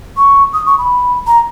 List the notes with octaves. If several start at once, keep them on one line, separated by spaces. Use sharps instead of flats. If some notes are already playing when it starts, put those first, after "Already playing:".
C#6
D#6
C#6
B5
A#5